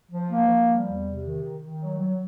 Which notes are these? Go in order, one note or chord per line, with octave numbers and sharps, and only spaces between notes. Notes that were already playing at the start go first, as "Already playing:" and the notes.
F3
A#3
F3
G3
E2
C3
D#3
D#3
D#3
F#3
F#3